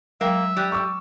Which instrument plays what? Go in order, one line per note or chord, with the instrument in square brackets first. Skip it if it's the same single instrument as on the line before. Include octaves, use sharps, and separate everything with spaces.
[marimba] F#3 G#3 G5 [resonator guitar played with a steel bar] A#3 [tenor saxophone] E5
[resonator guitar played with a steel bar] G3 [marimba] G5 F#6
[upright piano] C#6 D6 E6